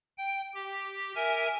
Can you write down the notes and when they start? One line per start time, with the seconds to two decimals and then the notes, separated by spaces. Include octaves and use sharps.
0.18 G5
0.54 G4
1.15 A#4 E5 G#5